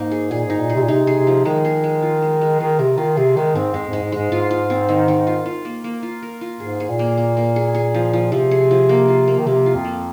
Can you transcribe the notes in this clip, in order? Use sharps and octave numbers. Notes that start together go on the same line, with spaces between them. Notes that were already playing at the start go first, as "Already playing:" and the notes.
Already playing: G#2 A#3 D#4
G#4
A#2 G#4
G#2 D#4
A#2
G#4
C3
A#2
C3 D#4
G#4
C3
F3
D#3 G#3
G#4
G#3
F4
G#3
G#3
D#3 F4
C3 A#4
D#3 F4
C3 G#4
D#3 G#3
G#2 C4
F2 G#3
G#2 G#3
G#2
G#3
G#2
G#2 F4
F4
C4
D#3
D#3
F4
F4
A#3
A#3
F4
A#4
F4
G#2 G#4
G#4
A#2
A#3
A#3
A#3
G#4
G#4
F3
F3
C3 F3
G#4
F3
A#3
F4
A#3
D#3
C3 A#3
F4
F2
A#3